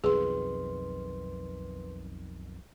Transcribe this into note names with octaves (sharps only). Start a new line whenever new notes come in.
B1 F2 D#3 G#4 B4 C6